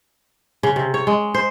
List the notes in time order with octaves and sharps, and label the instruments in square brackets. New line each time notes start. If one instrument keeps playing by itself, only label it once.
[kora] C#3
C3
C#5
G#3
C5